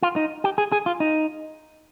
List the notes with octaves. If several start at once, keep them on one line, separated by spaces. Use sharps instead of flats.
F4
D#4
G4
G#4
G#4
F4
D#4